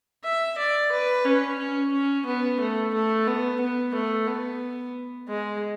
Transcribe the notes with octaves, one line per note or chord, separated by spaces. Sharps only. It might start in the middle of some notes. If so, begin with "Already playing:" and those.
E5
D5
B4
C#4
C#4
C#4
B3
A3
A3
B3
B3
A3
B3
G#3